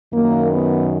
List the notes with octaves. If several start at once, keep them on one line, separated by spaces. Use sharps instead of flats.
F#2 D#3 A#3
B3